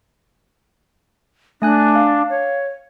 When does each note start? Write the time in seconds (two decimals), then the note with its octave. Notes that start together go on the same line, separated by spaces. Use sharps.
1.62 A3 D4 G#5 F#6
1.95 F5
2.30 C#5